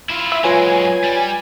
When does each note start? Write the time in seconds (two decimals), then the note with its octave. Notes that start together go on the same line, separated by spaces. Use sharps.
0.10 E4 F4
0.32 E5
0.44 F#3 G#3 F4 B4 C#5 G#5
1.04 G3